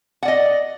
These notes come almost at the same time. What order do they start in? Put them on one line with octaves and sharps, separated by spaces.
F#5 D5 D#5